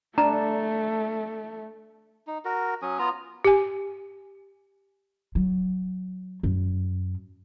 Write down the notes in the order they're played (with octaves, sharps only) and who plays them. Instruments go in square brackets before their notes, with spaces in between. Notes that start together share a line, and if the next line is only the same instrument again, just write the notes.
[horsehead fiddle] A3 [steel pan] D4 [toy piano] A#5
[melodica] D#4
F#4 A#4
F#3 C#4 D#6
B3 F4 A#5 D#6
[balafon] G4 G#5
[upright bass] F#3
F#2